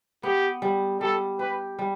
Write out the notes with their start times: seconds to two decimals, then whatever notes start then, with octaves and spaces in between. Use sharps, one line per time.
0.23 B3 G4
0.62 G3
1.01 G3 A4
1.39 G4 B4
1.79 G3